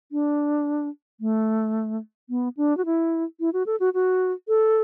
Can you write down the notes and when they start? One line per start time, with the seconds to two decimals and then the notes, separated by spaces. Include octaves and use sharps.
0.12 D4
1.20 A3
2.29 B3
2.57 D4
2.77 F#4
2.85 E4
3.40 E4
3.53 F#4
3.66 A4
3.80 F#4
3.94 F#4
4.48 A4